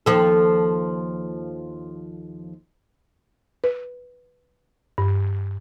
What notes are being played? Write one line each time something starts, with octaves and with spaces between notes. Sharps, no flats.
D#2 F3 A4
B4
G2